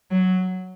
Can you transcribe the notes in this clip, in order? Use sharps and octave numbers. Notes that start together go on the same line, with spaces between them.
F#3